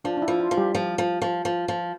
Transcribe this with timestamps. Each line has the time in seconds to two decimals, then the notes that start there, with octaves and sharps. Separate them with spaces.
0.05 F3 D4
0.17 D4
0.22 E4
0.28 F3
0.40 F4
0.51 F3
0.57 G3 G4
0.75 F3
0.98 F3
1.22 F3
1.45 F3
1.68 F3